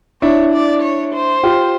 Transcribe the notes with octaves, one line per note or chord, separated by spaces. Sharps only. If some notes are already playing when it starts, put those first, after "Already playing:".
D4 E4 C#5
D5
C#5
C5
F4 G4